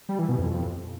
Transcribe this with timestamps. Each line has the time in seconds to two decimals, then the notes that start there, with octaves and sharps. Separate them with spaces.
0.09 G3
0.19 E3
0.29 B2
0.39 F2